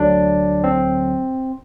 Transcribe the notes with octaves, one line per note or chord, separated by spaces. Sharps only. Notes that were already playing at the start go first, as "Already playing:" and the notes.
Already playing: D2 D3 F#3 D4
C4